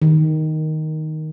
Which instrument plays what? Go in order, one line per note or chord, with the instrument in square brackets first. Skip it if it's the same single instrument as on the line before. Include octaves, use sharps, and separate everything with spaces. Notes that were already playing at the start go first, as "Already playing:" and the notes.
[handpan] D#3